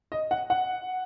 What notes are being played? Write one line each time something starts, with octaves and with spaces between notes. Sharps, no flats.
D#5
F#5
F#5